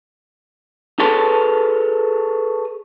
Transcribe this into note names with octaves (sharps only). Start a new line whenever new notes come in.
G#4 A4 B4 C#5 A5 C6